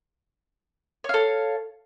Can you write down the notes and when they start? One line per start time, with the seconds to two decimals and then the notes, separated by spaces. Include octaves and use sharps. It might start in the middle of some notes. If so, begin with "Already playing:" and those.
1.04 C#5
1.09 F5
1.14 A4